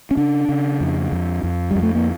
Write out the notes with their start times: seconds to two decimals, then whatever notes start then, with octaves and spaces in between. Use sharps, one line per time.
0.11 C#4
0.17 C#3 D4
0.49 C#3
0.81 F2
1.12 F2
1.43 F2
1.71 F2 G3
1.83 A3
1.95 A#3